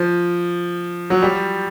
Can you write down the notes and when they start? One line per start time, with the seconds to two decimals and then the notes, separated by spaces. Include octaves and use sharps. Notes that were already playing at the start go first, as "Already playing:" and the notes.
Already playing: F3
1.10 F#3
1.22 G3